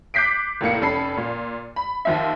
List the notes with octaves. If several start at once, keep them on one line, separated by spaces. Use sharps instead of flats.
D6 F#6 G6 B6 C7 D7
F1 A2 A#3 C#7
F1 C#4 A4 B5 C7
A#2
B5
D#2 F3 E5